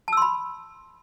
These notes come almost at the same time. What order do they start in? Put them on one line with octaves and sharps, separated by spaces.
A5 E6 C6 B5